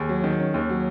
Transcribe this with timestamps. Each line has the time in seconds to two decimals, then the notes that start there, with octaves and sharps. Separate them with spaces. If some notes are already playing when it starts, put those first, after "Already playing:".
Already playing: D#2 G#4
0.09 F#3
0.24 D#3
0.40 C#4
0.54 D#2
0.70 F#3